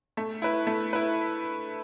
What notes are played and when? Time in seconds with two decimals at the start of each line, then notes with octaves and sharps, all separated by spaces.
0.17 A3
0.42 E4 B4
0.67 A3
0.93 E4 B4